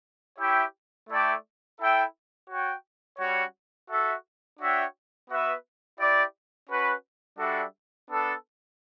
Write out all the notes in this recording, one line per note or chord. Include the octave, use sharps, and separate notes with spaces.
E4 G4 C#5 E5 G5
A3 E4 A4 D5 G5
E4 A4 E5 G5
F#4 C#5 G5
G3 C#4 F#4 C#5
F#4 A4 E5
D4 F#4 C#5 E5 G5
B3 F#4 B4 E5
E4 G4 D5
C#4 F#4 B4
G3 D4 F#4 A4 E5
B3 D4 A4